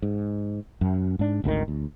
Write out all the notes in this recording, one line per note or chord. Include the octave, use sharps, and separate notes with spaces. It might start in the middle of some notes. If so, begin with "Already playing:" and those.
G#2
F#2
G#2 D4
G#1 D2 B2 D#3
D2